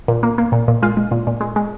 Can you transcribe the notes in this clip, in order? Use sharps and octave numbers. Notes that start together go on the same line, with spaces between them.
A#2
A#3
A#3
A#2
A#2
G#3 F4
G#3
A#2
A#2
G#3
G#3